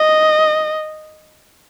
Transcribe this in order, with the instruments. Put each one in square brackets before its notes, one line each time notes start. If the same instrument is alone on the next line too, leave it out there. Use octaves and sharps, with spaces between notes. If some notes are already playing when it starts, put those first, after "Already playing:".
Already playing: [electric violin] D#5